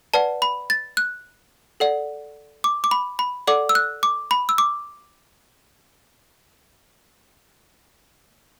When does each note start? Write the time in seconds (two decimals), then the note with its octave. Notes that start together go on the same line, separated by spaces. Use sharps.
0.14 B4 D5 F#5 A5
0.42 B5
0.70 A6
0.97 F#6
1.80 A4 D5 F#5
2.64 D6
2.84 D6
2.91 B5
3.19 B5
3.47 A4 D5 F#5 D6
3.69 E6
3.75 F#6
4.03 D6
4.31 B5
4.49 E6
4.58 D6